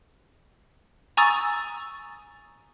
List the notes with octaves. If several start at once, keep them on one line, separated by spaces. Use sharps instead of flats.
G#5 A#5 C#6 D#6 E6 A6